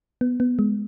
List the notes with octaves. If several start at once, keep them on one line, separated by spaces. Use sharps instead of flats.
B3
B3
G#3